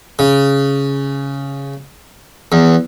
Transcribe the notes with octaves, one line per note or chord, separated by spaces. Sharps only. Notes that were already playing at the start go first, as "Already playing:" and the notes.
C#3
E2